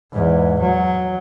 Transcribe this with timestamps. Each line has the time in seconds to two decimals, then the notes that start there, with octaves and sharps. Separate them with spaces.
0.12 E2 G#2
0.61 F#3